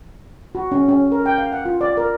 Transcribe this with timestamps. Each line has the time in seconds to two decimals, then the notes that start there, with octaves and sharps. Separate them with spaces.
0.55 F#4
0.72 C#4
0.89 C#4
1.12 A#4
1.26 G5
1.38 F5
1.52 F#5
1.65 F4
1.81 D5
1.97 A#4